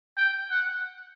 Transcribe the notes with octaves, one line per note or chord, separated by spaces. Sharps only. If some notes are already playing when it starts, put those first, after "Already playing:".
G5
F#5